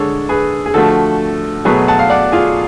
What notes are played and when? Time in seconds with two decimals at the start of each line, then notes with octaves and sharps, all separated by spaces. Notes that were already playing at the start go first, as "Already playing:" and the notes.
Already playing: D3 G#3 A4 C#5
0.29 G#4 B4
0.66 G#4
0.74 D3 F3 A3 F#4 A4
1.65 B2 F#3 A3 G#4 B4
1.88 F#5 A5
1.99 F5
2.10 D5 F#5
2.32 F4 G#4